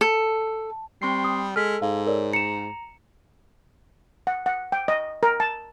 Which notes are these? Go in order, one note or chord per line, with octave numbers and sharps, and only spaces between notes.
A4
G3 C4 C6 C7
D#6
G#3 A4 F6 B6
G#2 F5
A#4 C#5 D5
A#5 C#7 E7
F#5
F#5
G5
D#5
A#4
A5